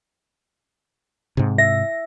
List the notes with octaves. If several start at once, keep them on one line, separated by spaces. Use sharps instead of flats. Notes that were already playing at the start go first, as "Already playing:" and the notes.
G#2 C3
E5 A#6